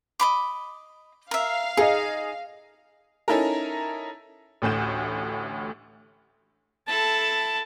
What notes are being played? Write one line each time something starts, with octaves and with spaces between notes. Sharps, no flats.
D#5 B5 D6
A#4 E5 F5
D#4 G#4 D#5
C#4 D#4 E4 A4 A#4
A1 D2 A2 G6 E7
E4 A4 A5